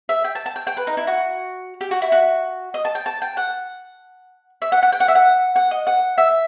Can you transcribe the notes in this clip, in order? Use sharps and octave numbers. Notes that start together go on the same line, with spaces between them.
E5
G5
A5
A5
G5
G5
B4
D#4
E4
F#4
G4
F#4
E4
F#4
D#5
A5
G5
A5
G5
F#5
E5
F#5
F#5
G5
F#5
E5
F#5
F#5
D#5
F#5
E5